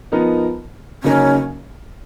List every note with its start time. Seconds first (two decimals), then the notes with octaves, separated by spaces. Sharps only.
0.12 F3 B3 D#4 A#4
1.03 C#3 F#3 A#3 C#4 D#4 A#4